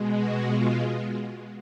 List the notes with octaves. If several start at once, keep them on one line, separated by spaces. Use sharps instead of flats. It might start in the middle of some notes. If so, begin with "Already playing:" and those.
Already playing: B2 G#3
F#4
F4